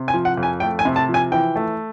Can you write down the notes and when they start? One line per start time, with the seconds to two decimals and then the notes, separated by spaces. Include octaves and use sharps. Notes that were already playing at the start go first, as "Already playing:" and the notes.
Already playing: C3
0.08 G#5
0.14 F3
0.25 F#5
0.38 F2
0.43 G#5
0.60 A3 G5
0.79 G#5
0.85 C3
0.96 A5
1.09 F3
1.14 G#5
1.32 E3 G5
1.56 A3